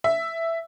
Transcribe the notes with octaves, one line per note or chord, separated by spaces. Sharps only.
E5